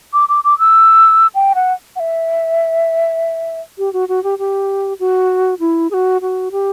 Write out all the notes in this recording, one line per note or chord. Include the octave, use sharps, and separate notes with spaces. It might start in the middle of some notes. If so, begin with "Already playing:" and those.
D6
D6
D6
E6
G5
F#5
F#5
E5
G4
F#4
F#4
G4
G4
F#4
E4
G#4
F#4
F#4
G4